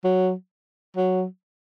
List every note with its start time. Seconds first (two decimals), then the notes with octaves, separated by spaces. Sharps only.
0.04 F#3
0.96 F#3